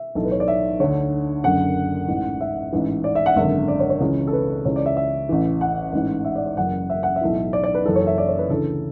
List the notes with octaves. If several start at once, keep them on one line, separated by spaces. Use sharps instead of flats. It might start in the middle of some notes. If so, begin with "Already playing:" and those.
Already playing: E5
B1 A2 E3 A4
B4
C#5
D5
E5
D2 D3 C#5
F#1 F#2 D3 F#5
A1 G#2 E3
E5
A1 G#2 E3
D5
E5
F#5
G#1 F#2 D3 E5
D5
C#5
C#5
C#2 C#3 E3
A4
B4
C#2 C#3 E3 C#5
D5
E5
E5
A1 A2 E3
F#5
A1 G#2 E3
E5
D5
D5
F#1 F#2 E3 F#5
E5
F#5
E5
B1 A2 E3
D5
D5
B4
F#1 F#2 E3 A4
C#5
E5
D5
C#5
B4
D2 C#3 E3 A4